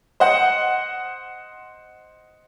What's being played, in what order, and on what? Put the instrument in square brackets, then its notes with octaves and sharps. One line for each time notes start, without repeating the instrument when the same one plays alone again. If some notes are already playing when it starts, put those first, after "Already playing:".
[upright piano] C5 D#5 F#5